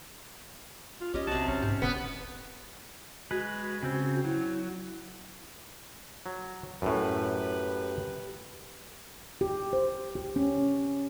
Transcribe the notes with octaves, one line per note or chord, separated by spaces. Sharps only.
F4
B1 C#4 G4 D#5
C3 F#4 A5
B1 C#4
G#2 G4
E1 B3
G#3 F#4 B4
C#3 C4
F#3 E4
F#3
F#2 A2 G4 B4
G4
C5
G4
C#4